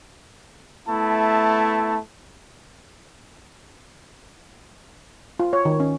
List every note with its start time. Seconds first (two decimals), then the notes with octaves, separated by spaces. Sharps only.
0.88 A3 B3 E4 A5
5.39 F4
5.53 C#5
5.65 D#3
5.80 C#4